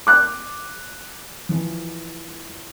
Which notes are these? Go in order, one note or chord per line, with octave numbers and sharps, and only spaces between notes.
D6 F#6
E3 F3